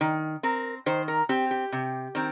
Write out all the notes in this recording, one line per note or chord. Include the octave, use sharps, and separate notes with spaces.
D#3
C4 A#4
D#3 C5
A#4
C4 G4
G4
C3
D#3 C4